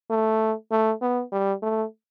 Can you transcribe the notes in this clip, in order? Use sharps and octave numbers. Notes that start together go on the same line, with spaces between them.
A3
A3
B3
G3
A3